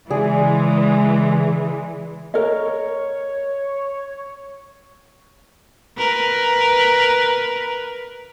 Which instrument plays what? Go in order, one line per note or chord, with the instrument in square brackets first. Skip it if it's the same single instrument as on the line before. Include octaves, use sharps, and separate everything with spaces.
[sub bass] C#3 [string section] E3 G#3 [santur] G#4 D5
[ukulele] A#4 D#5 [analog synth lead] C#5
[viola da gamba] A#4 B4